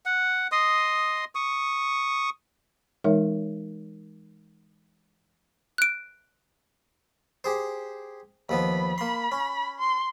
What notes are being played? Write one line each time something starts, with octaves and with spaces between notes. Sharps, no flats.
F#5
D#5 C6 D#6
C#6 D#6
E3 G#3 D#4 A#4 C#5 E5
F#6 D7
G4 G#4 C5
D#2 F3 B3 B5
A#3 B5 C6
C#4
C6